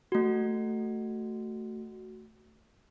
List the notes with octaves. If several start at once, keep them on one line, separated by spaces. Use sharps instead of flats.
A3 F#4